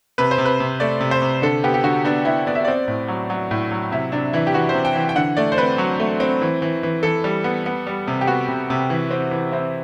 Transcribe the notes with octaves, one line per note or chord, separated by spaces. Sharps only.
C3 B4
C5
C3
B4
C3
A3 D5
C3
C5
C3
D3 A4
B3 G4
G4
D3 F#4
B3 D4
B3 E4
B3 D5
E5
C4 D5
A2
F#3
F#3
A2
F#3
C3 E4
C3 D4
E3 E4
G4
E3 F#4
C5
C3
G5
E3
G5
D3 F#5
A3 D5
C5
C4 B4
F#3
A3
C4
E3
E3
E3
E3 A4
G3
B3
B3
G3
C3
G4
B3 F#4
C3
C3
E3
C4
E3
C4 E4